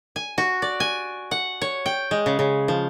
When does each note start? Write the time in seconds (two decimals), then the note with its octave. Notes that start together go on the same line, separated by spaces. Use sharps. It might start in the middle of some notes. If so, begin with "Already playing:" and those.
0.16 G#5
0.38 F#4
0.62 D5
0.80 G#5
1.31 F#5
1.62 C#5
1.86 G5
2.11 G#3
2.26 C#3
2.39 C#3
2.68 F3